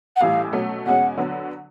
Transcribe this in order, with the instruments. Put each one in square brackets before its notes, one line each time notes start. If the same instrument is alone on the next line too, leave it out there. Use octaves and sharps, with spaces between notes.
[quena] F#5
[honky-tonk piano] A1 A2 E3 G3 [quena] F5
[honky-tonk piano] B2 F#3 A3 C#4
[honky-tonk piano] E2 B2 G#3 C#4 [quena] F#5
[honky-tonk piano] D3 F#3 B3